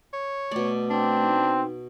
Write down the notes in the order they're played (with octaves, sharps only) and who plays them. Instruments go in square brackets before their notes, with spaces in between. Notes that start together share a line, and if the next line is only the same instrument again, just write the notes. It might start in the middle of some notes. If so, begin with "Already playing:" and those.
[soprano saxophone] C#5
[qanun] B2 D5 [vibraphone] A3 D6
[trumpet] C4 [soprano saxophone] D4
[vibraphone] D#4